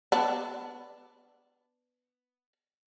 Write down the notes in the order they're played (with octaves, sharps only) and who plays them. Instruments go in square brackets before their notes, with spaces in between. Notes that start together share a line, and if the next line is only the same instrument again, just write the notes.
[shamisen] B3 D4